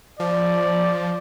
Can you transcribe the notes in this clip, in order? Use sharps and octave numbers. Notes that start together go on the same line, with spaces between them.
F3 D5